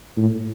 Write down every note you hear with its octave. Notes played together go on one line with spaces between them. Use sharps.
A2